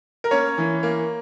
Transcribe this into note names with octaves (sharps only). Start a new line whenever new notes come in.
A#4
A#3 C#4 C#5
E3
A#3